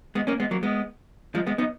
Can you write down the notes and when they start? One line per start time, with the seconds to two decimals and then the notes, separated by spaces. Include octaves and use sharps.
0.15 G#3 B3
0.27 A#3 C#4
0.40 G#3 B3
0.51 F#3 A#3
0.63 G#3 B3
1.35 F3 G#3
1.47 G#3 B3
1.58 B3 D#4